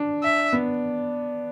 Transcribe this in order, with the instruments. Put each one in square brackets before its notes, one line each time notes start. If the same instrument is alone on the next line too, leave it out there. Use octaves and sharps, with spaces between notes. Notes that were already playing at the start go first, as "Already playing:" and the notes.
Already playing: [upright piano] D4
[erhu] E5
[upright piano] B3